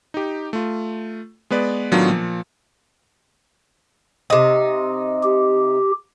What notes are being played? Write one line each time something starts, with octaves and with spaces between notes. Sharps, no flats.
D#4 G4
A3 F4
G#3 B3 B4 D5
A2 D#3 F#3 B3 D4 F4
A#2 F3
C3 D#4
G4